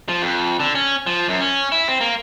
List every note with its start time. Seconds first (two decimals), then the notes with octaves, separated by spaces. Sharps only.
0.09 F3
0.22 F2
0.60 D3
0.75 C#4
1.07 F3
1.28 F#2
1.41 C#4
1.72 E4
1.88 C4
2.01 A#3